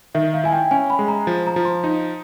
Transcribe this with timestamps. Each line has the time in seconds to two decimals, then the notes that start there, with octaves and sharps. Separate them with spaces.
0.15 D#3 E5
0.34 F5
0.44 E4 G#5
0.52 G5
0.71 C#4 G#5
0.90 B5
0.99 G#3
1.08 A#5
1.27 F3
1.47 A#5
1.56 F3
1.65 C6
1.84 D#4